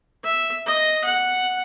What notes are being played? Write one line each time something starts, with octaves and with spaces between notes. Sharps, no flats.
E5
D#5
F#5